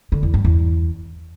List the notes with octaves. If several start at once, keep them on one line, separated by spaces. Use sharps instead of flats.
D3
E2
G2
E2